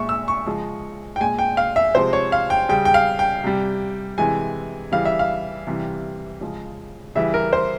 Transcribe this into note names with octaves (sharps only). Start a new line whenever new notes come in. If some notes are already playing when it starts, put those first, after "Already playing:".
Already playing: A#2 G#3 E5 C#6
E6
C#6
C#3 F3 G#3
G5
A#2 G#3 G#5
G5
F5
E5
C3 F3 G#3 C5
C#5
F5
G5
C#3 G3 G5
G5
F5
G5
C3 G3
C3 E3 G#3 G#5
C#3 E3 G3 F5
E5
F5
C3 E3 G3
C#3 F3 G#3
C#3 E3 G3 E5
A#4
C5